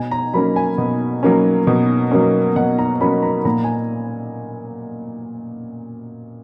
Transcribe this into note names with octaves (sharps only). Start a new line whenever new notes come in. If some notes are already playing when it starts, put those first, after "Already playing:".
Already playing: B2 G#5
A#5
F#3 A#3 C#4 B5
G#5
B2
F#3 A#3 C#4
B2
F#3 A#3 C#4
B2 F#5
A#5
F#3 A#3 C#4 B5
A#5
A#2 A#5
G#5